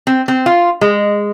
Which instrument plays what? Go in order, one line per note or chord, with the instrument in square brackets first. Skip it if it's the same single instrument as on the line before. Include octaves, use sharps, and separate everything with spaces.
[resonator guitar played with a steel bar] C4
C4
F4
G#3